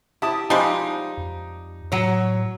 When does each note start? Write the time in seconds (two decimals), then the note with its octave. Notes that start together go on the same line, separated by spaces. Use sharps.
0.22 E4 G4 A5 D#6
0.50 F3 G3 G#3 D#4 G4
1.18 F2
1.92 A2 F#3 C#5